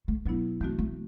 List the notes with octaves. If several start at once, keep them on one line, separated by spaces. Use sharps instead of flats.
A3
B2 F#3 B3 D4 E4
E3 A3 B3 C4 F#4
A3